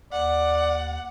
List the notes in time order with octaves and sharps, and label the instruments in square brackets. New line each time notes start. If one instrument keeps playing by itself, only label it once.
[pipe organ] D#2 [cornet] D5 [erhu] F#5